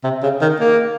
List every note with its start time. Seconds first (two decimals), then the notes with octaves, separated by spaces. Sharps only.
0.04 C3
0.23 C#3
0.41 D#3
0.60 A#3